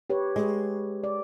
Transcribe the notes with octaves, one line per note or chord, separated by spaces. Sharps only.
G4 B4 C#5
G#3
D5